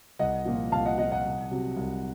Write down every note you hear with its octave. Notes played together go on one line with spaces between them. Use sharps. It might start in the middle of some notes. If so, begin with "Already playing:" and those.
C2 D#5 F#5
A#2 F3
C2 F5 A5
D#5 F#5
A#2 F3 D#5 F#5
D#5 F#5
C2
C3 F#3
C2